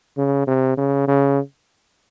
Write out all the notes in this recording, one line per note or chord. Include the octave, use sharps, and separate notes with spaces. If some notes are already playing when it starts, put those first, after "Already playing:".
C#3
C3
C#3
C#3